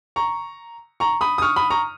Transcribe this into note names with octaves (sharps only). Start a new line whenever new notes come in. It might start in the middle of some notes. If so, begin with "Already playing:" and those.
A#5 C#6
A#5 C#6
B5 D#6
D#6
C#6 F6
B5 D#6
A#5 C#6